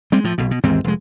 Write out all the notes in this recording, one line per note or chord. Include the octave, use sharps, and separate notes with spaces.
G3 G#3 C4
A2 F3
B1 B2
B2
D#2 G#2 E3 C4
F1 G#3